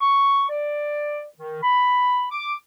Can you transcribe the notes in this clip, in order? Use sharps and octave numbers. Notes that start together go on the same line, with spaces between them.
C#6
D5
D#3
B5
D6